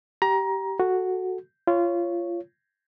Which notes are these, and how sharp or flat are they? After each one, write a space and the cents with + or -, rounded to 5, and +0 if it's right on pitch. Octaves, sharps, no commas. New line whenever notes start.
G4 -15 A#5 +20
F#4 +0 A4 +0
F4 -20 C#5 +0